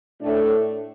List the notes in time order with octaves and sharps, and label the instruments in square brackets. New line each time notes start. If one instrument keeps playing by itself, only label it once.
[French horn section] A2 A3 D4